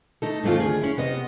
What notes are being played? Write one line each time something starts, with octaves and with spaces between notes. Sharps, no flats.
A3 D#4 A4
G#2 D#3 A3 C4 F4
D#2 D3 G#4
C#4 E4
C3 B3 D#5